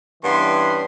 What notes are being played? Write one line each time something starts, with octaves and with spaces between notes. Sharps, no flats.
G2 E3 B3 C#4 C6